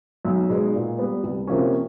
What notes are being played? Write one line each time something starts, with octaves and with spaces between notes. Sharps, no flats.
B1
B2 G#3 B3 D#4
A#2
G3 B3
C2
C3 F3 A#3 C#4